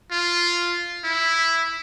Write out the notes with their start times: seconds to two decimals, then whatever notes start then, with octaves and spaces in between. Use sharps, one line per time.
0.11 F4
1.04 E4